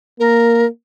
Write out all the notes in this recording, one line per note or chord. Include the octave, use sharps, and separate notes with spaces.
A#3 A#4